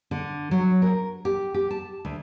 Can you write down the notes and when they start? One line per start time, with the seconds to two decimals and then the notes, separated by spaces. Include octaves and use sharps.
0.11 D3
0.51 F#3
0.82 A#4
1.25 G4
1.54 G4
1.71 A5
2.05 D2